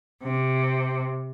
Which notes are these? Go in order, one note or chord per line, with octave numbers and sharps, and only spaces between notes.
C3